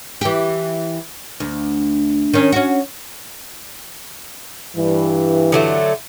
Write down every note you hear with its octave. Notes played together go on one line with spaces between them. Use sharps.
E3 G4
D2
D#3 C#4
C#4 F#4
G2 E3
D3 F#3 A3